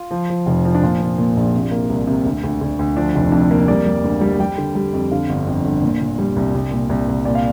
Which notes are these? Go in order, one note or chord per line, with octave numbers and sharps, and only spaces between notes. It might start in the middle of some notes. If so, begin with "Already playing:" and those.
Already playing: F4
F3
F3
F1
F3
D4
A#2 F4
A#2
A#2
A#1
C3
A#3
C2
C3
D2
D2
D2
D2
F3 D4
F1
F2 D4
A#3
G3 D5
G3
D2
G3
G3 G5
D3
G3
F2
D3 F5
G1
F2
G1
A#2
A#2
G3
C2
C2
A#2
C2
C2
A#2 D5
F5